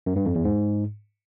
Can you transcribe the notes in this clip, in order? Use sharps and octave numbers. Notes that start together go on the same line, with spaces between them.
F#2
G2
F2
E2
G#2